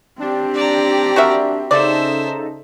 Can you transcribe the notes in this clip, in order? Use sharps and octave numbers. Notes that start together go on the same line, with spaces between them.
C4 D4 G4
D5 A#5
F#4 A#4 E5
C#3 D#4 A4 C5 D5 E5